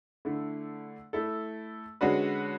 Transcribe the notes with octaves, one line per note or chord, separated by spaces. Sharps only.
D3 A3 E4
A3 E4 A4
D3 G#3 C#4 F#4 B4